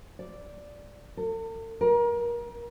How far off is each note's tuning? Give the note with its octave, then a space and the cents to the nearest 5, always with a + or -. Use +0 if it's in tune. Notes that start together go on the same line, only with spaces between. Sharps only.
D5 -5
A4 +45
A#4 +30